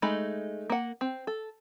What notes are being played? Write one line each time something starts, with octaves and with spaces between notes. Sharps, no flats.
G#3 A3 D#4 B5
A#3 F#5
C4
A4